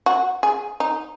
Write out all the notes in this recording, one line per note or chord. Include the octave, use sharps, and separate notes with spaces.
F#4
G#4
D#4